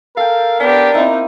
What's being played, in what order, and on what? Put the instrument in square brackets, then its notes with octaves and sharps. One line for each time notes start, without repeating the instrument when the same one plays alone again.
[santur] A4 G5 [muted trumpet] A#4 [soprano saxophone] F5
[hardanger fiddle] B3 G4 [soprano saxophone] D4 [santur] F5
[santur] A#3 E4 [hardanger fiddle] C4 D#4